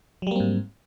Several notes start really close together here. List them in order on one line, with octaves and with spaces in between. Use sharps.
F#3 G3 A#3 C4 G#2